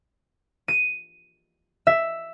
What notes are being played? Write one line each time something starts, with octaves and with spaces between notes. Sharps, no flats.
D#7
E5